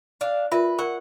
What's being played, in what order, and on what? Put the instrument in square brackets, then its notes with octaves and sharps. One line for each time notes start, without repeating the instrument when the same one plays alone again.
[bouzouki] D4 F5
[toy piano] F4 A#4 E5 [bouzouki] B4
[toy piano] A#4 D5 C#6 [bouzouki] F#5